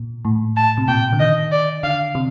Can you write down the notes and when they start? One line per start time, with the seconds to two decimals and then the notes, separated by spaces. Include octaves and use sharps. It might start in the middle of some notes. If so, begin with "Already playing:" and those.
Already playing: A#2
0.25 A2
0.57 A5
0.77 C3
0.88 A#2 G5
1.13 D3
1.20 D#3 D#5
1.52 D5
1.83 D3 F5
2.15 C3